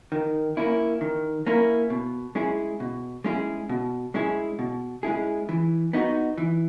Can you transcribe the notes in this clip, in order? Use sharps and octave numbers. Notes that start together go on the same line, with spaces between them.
D#3
A#3 C#4 E4
D#3
A#3 C#4 E4
B2
G#3 C#4 E4 G#4
B2
G#3 C#4 E4 G#4
B2
G#3 C#4 E4 G#4
B2
G#3 C#4 E4 G#4
E3
B3 D#4 F#4
E3